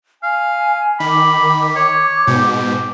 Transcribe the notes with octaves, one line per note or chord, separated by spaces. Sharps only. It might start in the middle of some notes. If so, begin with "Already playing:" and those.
F5 G#5
D#3 B5 D6
C#5
G#2 B2 G4